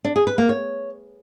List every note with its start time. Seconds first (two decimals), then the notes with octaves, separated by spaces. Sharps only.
0.04 D4
0.16 G#4
0.27 B4
0.38 A#3
0.49 C#5